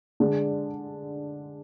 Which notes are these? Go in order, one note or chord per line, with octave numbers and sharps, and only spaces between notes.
D3 G#3 D4 G#4